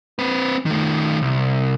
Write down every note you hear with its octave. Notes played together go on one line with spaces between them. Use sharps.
C4 B4
D#3 A3
C2